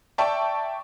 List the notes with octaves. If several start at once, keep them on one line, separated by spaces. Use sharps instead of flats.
D5 E5 G5 A5 C#6